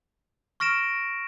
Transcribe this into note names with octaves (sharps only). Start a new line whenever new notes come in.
C#6 F6 A#6 D7 E7